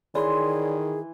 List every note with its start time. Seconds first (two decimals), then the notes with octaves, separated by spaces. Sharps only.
0.15 D#3 E3 G#4 C#5 D5 C6